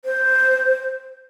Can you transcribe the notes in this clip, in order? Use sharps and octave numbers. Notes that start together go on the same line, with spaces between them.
C5